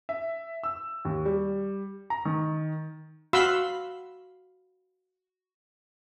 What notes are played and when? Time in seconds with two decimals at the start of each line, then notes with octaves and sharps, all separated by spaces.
0.09 E5
0.63 E6
1.05 D#2
1.25 G3
2.10 A#5
2.25 D#3
3.33 F#4 F5 B5 C6 E6